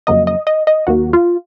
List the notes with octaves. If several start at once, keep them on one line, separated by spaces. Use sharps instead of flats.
F2 C#3 F#3 A#3 D#5
D#5
D#5
D#5
D#2 D#3 F#3 A#3 F#4
F4